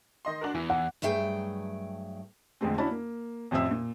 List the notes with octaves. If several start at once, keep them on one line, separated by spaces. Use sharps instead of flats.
D#3 D#5 C6
D4 F#4 A#4
E2 E3
F#5
G2 F#3 A3 G#4 G5
F2 D3 G#3 A3 C4
C#4 D4 E4 F#4 A5 B5
A#3
A1 F2 C4 C5 E5 E6
A#2